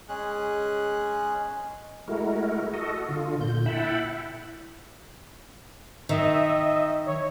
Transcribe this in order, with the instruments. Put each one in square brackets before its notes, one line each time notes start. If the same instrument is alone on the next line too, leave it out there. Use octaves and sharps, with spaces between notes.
[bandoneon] G#3 C#4 G#4 F#6
[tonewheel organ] G#3 A3 E4 F#4 A#4
F#4 A4 D#5
D3 F4
A#2 G6
E4 E5 F#5 G5 A5 B5
[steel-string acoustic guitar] D#3 [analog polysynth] D#5 E5
[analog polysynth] C#5